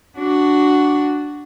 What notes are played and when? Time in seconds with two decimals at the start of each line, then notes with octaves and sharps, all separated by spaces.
0.19 D4 F#4